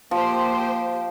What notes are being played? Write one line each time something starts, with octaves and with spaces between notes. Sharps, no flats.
F3 A#3 G4 C5